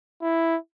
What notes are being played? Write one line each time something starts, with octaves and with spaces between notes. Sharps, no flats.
E4